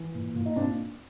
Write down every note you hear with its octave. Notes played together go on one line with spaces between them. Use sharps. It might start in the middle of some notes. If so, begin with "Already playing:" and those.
Already playing: E3
A#2
A#2
D#4
A#2 C4 D4